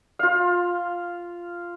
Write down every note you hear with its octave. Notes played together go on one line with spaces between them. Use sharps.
F4 F5